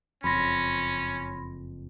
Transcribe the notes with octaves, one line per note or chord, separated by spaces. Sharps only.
F#1 F2 C#4 B5 C6 A#6